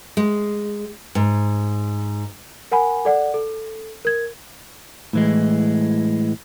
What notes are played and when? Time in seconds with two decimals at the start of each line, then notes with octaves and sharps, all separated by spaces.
0.17 G#3
1.15 G#2
2.72 A#4 F#5 G#5 B5
3.05 A4 D5 F#5
3.34 A4
4.05 A#4 G#6
5.13 A2 E3 G#3